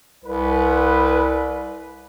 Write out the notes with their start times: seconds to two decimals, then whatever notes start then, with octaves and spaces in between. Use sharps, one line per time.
0.25 C2 B4